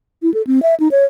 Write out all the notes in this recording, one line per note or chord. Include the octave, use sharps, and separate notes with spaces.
E4
A4
C4
E5
D#4
C#5